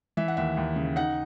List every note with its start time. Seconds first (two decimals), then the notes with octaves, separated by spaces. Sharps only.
0.17 E3 E5
0.28 F#5
0.37 D#2 E5
0.57 D#2
0.76 C#3
0.96 D#4 F#5